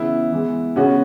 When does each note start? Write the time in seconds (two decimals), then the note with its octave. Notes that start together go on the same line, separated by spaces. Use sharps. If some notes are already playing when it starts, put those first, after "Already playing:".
Already playing: C#3 E3 B3 E4
0.32 E3 G#3 B3
0.76 C#3 G#3 B3 C#4 F#4